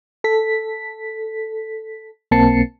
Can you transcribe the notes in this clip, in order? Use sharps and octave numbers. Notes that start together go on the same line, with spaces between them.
A4 B6
B1 A#3 C4 A5 C7 C#7